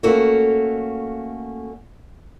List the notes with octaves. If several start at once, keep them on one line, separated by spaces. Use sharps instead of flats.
A3 A#3 C#4 F#4 A4